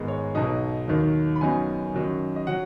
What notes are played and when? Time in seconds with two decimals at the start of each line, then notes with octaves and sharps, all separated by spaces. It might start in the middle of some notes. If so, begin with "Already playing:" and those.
Already playing: G#2 D#3 G#3 B3 D#4
0.08 C#5
0.35 B1 B2 F#3 D#4 D#5
0.88 D#2 D#3 F#3 D#4
1.36 B5
1.41 F#2 C#3 F#3 B3 D#4 G#5
1.94 F#2 D#3 F#3 D#4
2.36 D#5
2.47 F#3 F#5